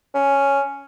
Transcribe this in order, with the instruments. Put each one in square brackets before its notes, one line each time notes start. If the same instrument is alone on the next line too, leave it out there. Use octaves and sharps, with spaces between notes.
[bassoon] C#4